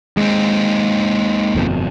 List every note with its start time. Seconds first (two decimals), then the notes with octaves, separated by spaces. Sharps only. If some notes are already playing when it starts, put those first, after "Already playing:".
0.17 D#2 G#3 C4
1.55 G1 F2 B2